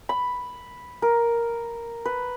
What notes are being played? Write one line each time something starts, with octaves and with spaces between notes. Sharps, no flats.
B5
A#4
B4